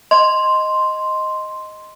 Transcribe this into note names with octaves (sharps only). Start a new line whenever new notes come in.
D#5 C6